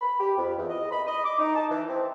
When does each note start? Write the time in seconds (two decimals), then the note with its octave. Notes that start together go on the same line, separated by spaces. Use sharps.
0.01 B5
0.19 G4
0.37 F2
0.57 E2
0.69 D#5
0.91 B5
1.07 D#5
1.24 D6
1.39 D#4
1.55 A5
1.69 E3
1.88 C4